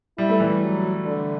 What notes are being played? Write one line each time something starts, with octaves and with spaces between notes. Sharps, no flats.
G3 E4
A3
E3 G3
F#3
D3